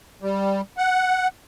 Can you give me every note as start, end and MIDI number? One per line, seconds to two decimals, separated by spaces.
0.22 0.61 55
0.78 1.28 78